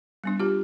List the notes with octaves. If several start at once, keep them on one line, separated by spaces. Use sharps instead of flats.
G3 B3 D4
F4 G4